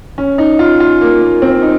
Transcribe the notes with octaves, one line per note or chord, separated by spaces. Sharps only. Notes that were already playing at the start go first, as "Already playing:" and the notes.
C#4
D#4
F4
F4
A#3
A#3
C4
D#4